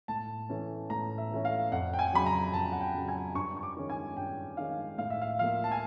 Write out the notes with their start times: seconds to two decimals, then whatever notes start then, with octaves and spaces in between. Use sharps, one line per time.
0.08 A2 A5
0.49 E3 A3 C#4
0.90 A2 A#5
1.18 E5
1.31 E3 A3 C#4
1.45 F5
1.72 F2 F#5
1.93 G5
1.99 G#5
2.13 C#3 F#3 B5
2.26 A#5
2.53 F2 A5
2.72 F#5
2.81 G5
2.94 C#3 F#3
3.08 G#5
3.35 G2 C#6
3.57 C#6
3.63 D6
3.77 D#3 G#3 C#4
3.90 G#5
4.17 G2 G5
4.57 D#3 G#3 C#4 F5
4.98 A2 F5
5.10 E5
5.22 F5
5.39 F3 A#3 F5
5.64 A5
5.72 G#5